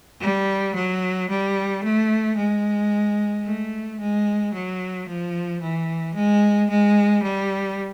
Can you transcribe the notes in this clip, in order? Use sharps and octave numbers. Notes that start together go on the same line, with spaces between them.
G3
F#3
G3
A3
G#3
A3
G#3
F#3
F3
E3
G#3
G#3
G3